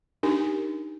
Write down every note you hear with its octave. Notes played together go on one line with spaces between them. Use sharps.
D4 D#4 G4 A#4 G#5